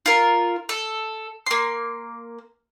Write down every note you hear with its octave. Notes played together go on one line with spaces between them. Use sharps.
F4 A#4
A4
A#3 C6